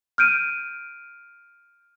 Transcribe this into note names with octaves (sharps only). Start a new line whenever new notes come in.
F6 G6 D7 D#7